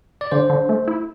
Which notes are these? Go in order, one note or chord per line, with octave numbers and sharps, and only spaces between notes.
D5
D3 C5
D3
A3
E4